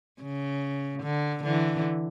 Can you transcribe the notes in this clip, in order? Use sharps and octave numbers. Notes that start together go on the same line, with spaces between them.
C#3
D3
D3 E3